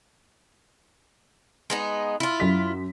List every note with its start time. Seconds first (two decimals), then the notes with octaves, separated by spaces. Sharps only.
1.70 G#3 B3 D#4
2.20 E4 F4
2.40 F#2 B6